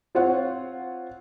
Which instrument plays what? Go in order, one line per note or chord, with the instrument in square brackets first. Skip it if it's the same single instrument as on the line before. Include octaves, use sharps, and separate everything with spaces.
[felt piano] C4 F4 C5 C#5 F#5